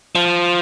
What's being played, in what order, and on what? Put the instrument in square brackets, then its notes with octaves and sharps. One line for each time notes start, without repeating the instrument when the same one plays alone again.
[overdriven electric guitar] F3